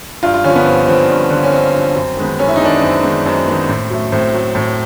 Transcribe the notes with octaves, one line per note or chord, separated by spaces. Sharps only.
G2 F4
F4
D3 F3 C#4
B3
G2 C4
D3 F3 C4
G2
D3 F3
C#4
G2 C4
D3 F3
F#2
D#3 G#3 B3
F#2 C#4
E4
D#4
D#3 G#3 B3 D4
C#4
F#2 C4
D#3 G#3 B3
F#2 C4
D#3 G#3 B3
A2
F#3 A3
A2 C4
F#3 A3
A2